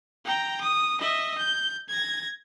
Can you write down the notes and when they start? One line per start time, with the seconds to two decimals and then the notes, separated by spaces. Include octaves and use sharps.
0.25 G5 A#5
0.61 D#6
1.01 D#5 E5
1.38 G6
1.89 G#6 A#6